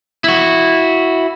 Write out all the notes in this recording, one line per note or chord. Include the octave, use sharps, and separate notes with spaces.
E4 F#4